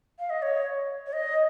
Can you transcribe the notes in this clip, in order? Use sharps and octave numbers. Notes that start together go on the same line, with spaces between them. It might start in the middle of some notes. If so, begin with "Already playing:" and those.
F5
D#5
C#5
C#5
D#5